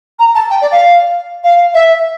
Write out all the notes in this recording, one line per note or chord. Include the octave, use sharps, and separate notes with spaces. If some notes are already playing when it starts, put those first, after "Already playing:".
A#5
A5
G5
D5
F5
F5
E5